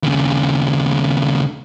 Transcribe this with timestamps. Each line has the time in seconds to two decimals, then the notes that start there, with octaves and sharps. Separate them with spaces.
0.03 D#2 C#3